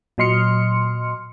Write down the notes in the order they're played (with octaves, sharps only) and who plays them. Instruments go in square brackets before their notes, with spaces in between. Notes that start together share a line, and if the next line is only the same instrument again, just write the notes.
[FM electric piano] A#2 F#3 D#5 C6 F6 C#7